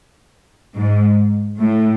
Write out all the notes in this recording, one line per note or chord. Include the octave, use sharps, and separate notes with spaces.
G#2
A2